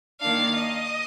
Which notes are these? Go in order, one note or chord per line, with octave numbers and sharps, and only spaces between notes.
D#3 A#3 D4 F5
D#5